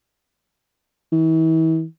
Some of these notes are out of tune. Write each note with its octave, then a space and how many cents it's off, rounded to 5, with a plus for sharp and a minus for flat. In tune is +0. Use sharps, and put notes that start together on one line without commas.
E3 -40